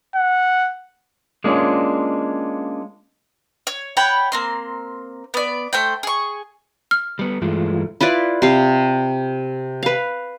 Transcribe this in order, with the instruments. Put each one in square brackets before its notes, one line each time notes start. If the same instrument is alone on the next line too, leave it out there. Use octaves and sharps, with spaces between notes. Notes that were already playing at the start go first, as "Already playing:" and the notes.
[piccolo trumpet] F#5
[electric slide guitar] G#3 A#3 C#4 D4 F4
[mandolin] C#5
C#5 F#5 G5 B5
A#3 C4 C6
B3 D5
A3 C5 G5
G#4 C#6
[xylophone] F6
[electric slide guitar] G3 B3
[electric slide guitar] G2 G#3 A3 [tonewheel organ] E3 F4
[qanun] E4 F4 B4 D5
C3 F5
B4 F5